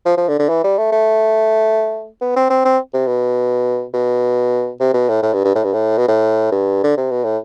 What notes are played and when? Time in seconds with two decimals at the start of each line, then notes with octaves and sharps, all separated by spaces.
0.06 F3
0.17 F3
0.29 D3
0.39 D3
0.49 E3
0.64 G3
0.78 A3
0.92 A3
2.21 B3
2.36 C4
2.50 C4
2.65 C4
2.94 C3
3.07 B2
3.94 B2
4.80 C3
4.94 B2
5.09 A2
5.23 A2
5.34 G2
5.44 G2
5.55 A2
5.64 G2
5.73 A2
5.98 B2
6.08 A2
6.52 G2
6.84 D3
6.97 C3
7.11 B2
7.24 A2